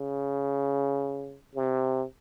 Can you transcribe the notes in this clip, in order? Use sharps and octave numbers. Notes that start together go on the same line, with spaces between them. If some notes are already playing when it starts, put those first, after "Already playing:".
Already playing: C#3
C3